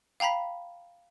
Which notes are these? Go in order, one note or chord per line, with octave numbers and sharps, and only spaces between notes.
F5 G5 A#5 B5 B6